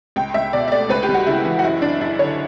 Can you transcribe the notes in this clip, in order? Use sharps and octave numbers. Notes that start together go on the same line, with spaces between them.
C#2 G5
C#2 E5
B2 D5
E5
A3 D5
C#2 B4
G4
G3
F#4
C#3 E4
E3
F#4
F#1 E4
F#1 D4
F#2 E4
D3 C#5